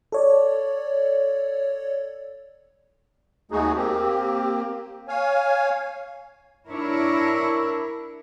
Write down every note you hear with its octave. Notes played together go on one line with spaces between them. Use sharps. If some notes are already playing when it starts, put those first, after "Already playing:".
A4 C#5 D5
D#2 G#3 A3 D#4 F#4 G#4
A#3 C4 G4
C#5 F5 G#5
D4 E4 A#4 C#5